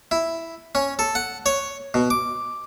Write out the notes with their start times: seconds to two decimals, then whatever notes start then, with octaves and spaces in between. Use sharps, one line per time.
0.11 E4
0.75 C#4
0.99 A4
1.15 F#5
1.46 C#5
1.94 B2
2.10 D6